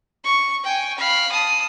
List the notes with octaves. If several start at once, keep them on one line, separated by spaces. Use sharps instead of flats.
C#6
G5 G#5
F5 B5
A5 D#6